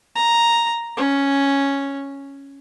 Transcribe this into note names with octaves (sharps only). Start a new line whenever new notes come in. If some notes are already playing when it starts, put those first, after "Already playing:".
A#5
C#4